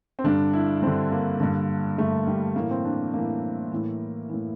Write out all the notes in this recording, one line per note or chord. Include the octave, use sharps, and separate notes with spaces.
C4
G2 D3 D4
E4
G2 D3 C4
A#3
G2 D3
G2 D3 A3
G3
A2 E3 A#3
C4
D4
A2 E3 A#3
A2 E3
A2 E3